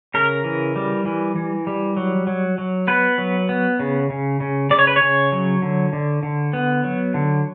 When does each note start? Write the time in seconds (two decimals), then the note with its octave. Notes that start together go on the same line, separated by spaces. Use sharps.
0.14 C#3 A#4
0.44 E3
0.76 G3
1.05 E3
1.36 E3
1.67 G3
1.97 F#3
2.27 F#3
2.58 F#3
2.88 B3 B4
3.18 F#3
3.49 B3
3.79 C#3
4.10 C#3
4.40 C#3
4.70 C#3 D5
4.79 C#5
4.87 B4
4.96 C#3 C#5
5.32 F#3
5.62 D3
5.93 D3
6.23 D3
6.53 B3
6.84 F#3
7.14 D3